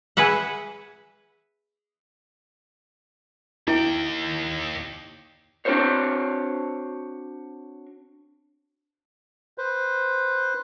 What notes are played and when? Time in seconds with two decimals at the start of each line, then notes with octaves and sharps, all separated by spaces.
0.17 G#4 B4 E5 F#5
3.68 D#2 E4 G5
5.65 C4 D4 F4 F#4 C5 C#5
9.58 B4 C5